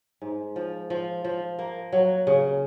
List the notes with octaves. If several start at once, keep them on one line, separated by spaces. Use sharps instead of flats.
G#2
F3
F3
F3
A#3
F#3
C#3